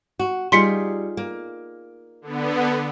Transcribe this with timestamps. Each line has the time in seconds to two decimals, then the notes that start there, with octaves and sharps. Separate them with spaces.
0.19 F#4
0.52 G3 D#4 F4 G#4 C6 B6 C#7
1.17 A#3
2.22 D3 B3